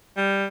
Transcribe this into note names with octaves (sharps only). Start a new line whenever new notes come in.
G3